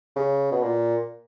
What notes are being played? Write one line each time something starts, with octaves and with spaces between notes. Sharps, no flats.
C#3
B2
A#2